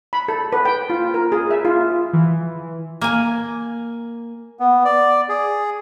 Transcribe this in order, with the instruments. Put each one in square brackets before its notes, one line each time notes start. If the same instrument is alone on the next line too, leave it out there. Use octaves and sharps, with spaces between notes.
[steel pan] B5
A4
B4
G5
F4
A#4
G#4
E5
F4
[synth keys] E3
[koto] A#3 G#5
[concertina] B3
D5
G#4